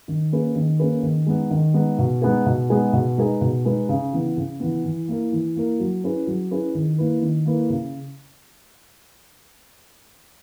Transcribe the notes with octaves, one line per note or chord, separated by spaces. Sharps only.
D#3
A#3 C#4 G#4 B4
D#3
A#3 C#4 G#4 B4
D#3
G#3 B3 D#4
D#3
G#3 B3 D#4
B2
G#3 B3 D#4 G#4
B2
G#3 B3 D#4 G#4
B2
G#3 D#4 G#4 B4
B2
G#3 D#4 G#4 B4
C#3
E3 B3
C#3
E3 B3
E3
A#3 E4 A#4
E3
A#3 E4 A#4
F#3
C#4 E4 G#4 B4
F#3
C#4 E4 G#4 B4
D#3
A#3 E4 B4
D#3
A#3 E4 B4
C#3